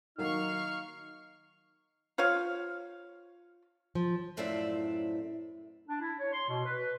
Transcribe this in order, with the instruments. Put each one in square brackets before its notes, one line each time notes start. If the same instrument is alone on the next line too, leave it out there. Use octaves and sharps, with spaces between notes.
[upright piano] D#3 F#3 A#3 [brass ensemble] D#4 [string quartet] F5 C#6 [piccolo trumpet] F6
[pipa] F4 C5 C#5 F5
[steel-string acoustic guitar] F3
F#2 A2 F3 C4 D5 E5
[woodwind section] D4
E4
C#5
C6
B2
B4